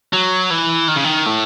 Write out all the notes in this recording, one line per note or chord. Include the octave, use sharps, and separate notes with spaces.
F#3
E3
D#3
C#3
D#3
A2